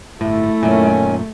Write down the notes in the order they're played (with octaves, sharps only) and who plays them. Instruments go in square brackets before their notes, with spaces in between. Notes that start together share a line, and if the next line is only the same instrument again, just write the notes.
[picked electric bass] G1 A2 [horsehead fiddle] A3 [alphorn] E4
[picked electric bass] F#2 A#2 [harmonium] D#3 C#4 G#5